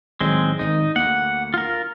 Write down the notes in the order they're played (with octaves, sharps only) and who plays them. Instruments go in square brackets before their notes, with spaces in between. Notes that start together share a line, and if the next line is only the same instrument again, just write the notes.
[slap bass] G#1 A2 F#3 [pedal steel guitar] G#3 C4
[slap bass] G#1 D#3 [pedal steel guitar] D#4
[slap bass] D2 A#3 [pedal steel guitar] F#5
[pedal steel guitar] F4 A#4